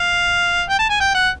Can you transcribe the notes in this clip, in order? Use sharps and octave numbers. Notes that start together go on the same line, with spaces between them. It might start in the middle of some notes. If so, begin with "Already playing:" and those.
Already playing: F5
G5
A5
G#5
G5
F#5